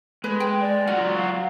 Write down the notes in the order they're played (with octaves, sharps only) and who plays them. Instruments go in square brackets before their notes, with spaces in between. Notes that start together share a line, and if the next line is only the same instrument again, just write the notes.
[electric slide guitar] G#3 [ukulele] B4
[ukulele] G5
[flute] D5
[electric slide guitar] F#3 F4 F#4 [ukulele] F#5
[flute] F5